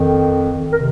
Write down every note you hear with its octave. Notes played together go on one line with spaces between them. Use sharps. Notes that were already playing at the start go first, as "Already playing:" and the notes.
Already playing: F2 D#3
C3 D#3 A#4